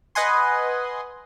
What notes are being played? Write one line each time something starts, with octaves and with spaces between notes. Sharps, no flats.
B4 D#5 F#5 G#5 C6